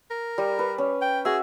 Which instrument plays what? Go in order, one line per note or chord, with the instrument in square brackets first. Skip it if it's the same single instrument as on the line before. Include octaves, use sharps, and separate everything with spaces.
[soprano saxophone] A#4
[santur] G3
B4
C#4
[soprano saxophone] G5
[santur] F#4 E5 [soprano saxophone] G#4